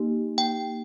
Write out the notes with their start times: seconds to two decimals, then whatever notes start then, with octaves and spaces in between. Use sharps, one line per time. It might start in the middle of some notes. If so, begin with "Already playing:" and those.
Already playing: A#3 D#4 G4
0.38 G5